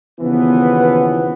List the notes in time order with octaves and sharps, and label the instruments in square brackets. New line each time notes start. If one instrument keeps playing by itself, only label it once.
[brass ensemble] D#2 C#3 E3 F3 B3